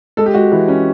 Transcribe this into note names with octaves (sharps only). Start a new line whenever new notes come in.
G#3 A4
G4
G#3 F#4
E3
C#4